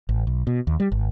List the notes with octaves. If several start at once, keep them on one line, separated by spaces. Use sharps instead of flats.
A1
B1
B2
D#2
G3
G#1